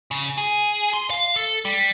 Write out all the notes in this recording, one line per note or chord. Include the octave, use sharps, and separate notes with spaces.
C#3
G#4
C6
F5
A4
G3